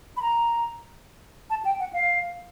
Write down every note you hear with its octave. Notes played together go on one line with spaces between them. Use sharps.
B5
A#5
A5
G5
F#5
F5